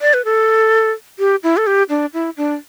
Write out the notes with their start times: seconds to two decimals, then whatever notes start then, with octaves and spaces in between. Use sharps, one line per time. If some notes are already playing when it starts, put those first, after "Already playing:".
0.01 D5
0.14 B4
0.25 A4
1.19 G4
1.43 E4
1.57 A4
1.67 G4
1.89 D4
2.14 E4
2.37 D4